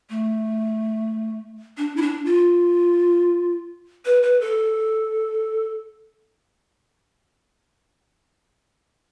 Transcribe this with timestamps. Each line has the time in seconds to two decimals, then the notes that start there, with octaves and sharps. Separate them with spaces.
0.10 A3
1.77 D4
1.96 E4
2.02 D4
2.25 F4
4.05 B4
4.23 B4
4.41 A4